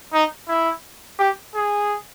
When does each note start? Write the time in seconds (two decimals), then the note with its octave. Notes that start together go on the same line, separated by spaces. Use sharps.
0.13 D#4
0.48 E4
1.19 G4
1.55 G#4